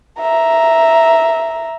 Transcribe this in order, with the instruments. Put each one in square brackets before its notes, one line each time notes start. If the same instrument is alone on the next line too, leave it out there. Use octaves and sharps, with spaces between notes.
[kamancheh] E5 A#5